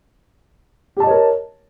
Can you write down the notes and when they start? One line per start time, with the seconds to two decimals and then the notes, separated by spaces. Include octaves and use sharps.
0.97 G4
1.00 A5
1.04 D#5
1.07 C#5
1.11 A#4